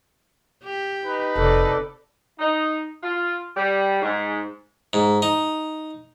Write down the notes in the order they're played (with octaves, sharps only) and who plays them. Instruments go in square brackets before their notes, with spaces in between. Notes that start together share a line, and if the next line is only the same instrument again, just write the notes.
[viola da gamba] G4
[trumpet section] D#4 B4
[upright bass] F1 [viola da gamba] C3 [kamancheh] A4 D5
[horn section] D#4
F4
G3
G#2
[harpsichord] G#2
D#4